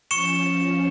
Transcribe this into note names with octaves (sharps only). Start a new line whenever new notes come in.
F3 C#4 C#6 C#7 E7